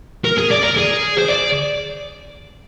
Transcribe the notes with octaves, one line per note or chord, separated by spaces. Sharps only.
A#4
G#4
D5
A#4
G#4
C5
D5